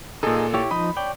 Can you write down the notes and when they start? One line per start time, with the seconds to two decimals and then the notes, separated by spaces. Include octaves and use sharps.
0.23 A#2 D#4 G#4 A4 D#5
0.54 E4 G4 C#5
0.71 F3 D#4 D#5 B5
0.97 C#5 D5 G5